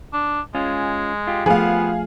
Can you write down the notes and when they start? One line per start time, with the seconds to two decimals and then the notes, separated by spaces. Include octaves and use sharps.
0.13 D4
0.55 G#3 C#4 F4
1.27 F4 G4
1.46 F3 A3 B3 G#4 F5